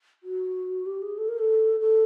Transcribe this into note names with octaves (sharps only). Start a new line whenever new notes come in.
F#4
G4
G#4
A4
A#4
A4
A4